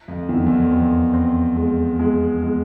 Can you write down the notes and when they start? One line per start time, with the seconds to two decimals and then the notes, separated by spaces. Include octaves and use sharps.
0.08 F2
0.29 E2 D#3
0.46 E2
0.50 F2
0.71 F2 C4
1.14 C4
1.56 G#3
1.99 G#3
2.42 G#3